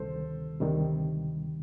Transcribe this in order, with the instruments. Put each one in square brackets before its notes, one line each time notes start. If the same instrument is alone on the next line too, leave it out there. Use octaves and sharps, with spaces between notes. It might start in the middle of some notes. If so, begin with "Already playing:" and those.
Already playing: [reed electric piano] D2 C3 D#3 G3 [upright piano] A4 C5
[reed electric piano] D2 C3 D#3 G3